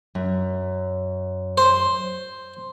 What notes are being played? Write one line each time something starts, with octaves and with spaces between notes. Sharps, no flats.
F#2
C5